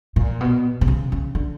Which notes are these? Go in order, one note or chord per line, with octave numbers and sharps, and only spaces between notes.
A#2
B2
C3
C#3
C#3
D3